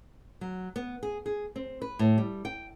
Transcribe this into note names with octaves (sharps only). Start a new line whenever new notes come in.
F#3
B3
G#4
G#4
C4
B4
A2
G3
G5